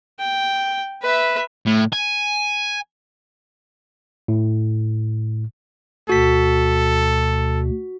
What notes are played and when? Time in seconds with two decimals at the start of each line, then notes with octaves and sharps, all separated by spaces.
0.20 G5
1.03 B4 E5
1.66 A2
1.93 G#5
4.28 A2
6.09 D2 B2 F#4 A4 B6